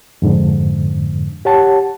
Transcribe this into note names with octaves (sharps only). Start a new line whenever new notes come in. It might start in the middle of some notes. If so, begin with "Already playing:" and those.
F2 G#2 D3
G4 C#5 F#5 A5